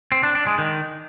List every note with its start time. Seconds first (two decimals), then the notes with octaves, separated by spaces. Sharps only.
0.12 C4
0.23 D4
0.35 D4
0.47 G#3
0.58 D#3